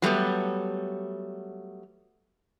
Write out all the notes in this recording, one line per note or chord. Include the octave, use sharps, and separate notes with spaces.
F#3 G3 A3 B3